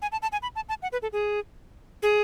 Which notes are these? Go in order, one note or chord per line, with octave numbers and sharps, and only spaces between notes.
G#5
A5
A5
G#5
B5
A5
A5
F#5
B4
A4
G#4
G#4